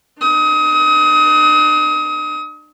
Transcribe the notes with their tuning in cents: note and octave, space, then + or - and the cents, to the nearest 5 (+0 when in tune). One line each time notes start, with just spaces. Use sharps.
D4 +40 D#6 +30